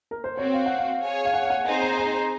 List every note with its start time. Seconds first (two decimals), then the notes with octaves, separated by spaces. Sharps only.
0.11 A#4
0.24 C5
0.37 C4 F#4 C5 C#5
0.54 F5
0.66 F#5
0.78 F5
1.02 G#4 C#5 G#5
1.25 F5
1.34 F#5
1.45 F5
1.50 F#5
1.65 C4 D#4 G#4 C5 G#5
1.82 A#5
1.98 A#5